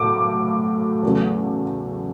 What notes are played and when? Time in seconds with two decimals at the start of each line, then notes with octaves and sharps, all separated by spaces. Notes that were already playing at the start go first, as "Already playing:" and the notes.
Already playing: A2 F#3 A3 D6
1.03 E2 C#3 F#3 A3